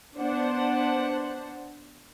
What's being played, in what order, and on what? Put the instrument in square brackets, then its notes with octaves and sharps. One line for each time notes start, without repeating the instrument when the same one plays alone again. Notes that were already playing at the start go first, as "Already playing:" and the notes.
[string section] B3 D4 C5 F#5